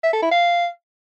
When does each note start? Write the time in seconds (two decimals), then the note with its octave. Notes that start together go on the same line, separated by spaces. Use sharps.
0.04 E5
0.13 A4
0.22 E4
0.31 F5